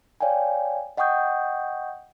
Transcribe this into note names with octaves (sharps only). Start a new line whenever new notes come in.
C#5 D5 F5 G5 G#5
D#5 F#5 G5 C#6 D#6 G6